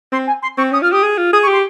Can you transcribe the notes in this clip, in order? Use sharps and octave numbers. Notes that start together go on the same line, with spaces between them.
C4 C6
G#5
C6
C4 C#6
C#4 D#6
F4 F6
G4 D#6
G#4
F4
G#4 D#6
C#6
G4 C6